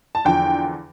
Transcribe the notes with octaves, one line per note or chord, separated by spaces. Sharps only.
A5
E2 D3 F3 G5